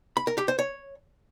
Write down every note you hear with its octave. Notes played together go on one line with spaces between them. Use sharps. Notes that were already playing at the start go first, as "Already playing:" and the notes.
B5
A#4
G4
C5
C#5